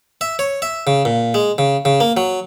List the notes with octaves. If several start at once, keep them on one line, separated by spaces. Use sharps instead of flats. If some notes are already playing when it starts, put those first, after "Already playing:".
E5
C#5
E5
C#3
A#2
G#3
C#3
C#3
A#3
F#3